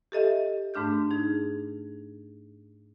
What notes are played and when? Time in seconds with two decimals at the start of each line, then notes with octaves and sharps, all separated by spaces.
0.12 G4 A4 D#5 E5
0.74 G#2 A3 D4 F6 G6
1.11 D#4 G#4